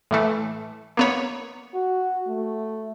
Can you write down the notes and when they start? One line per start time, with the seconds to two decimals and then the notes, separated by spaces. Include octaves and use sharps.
0.11 A2 E3 A3
0.97 A#3 B3 C#5
1.74 F#4
2.28 A3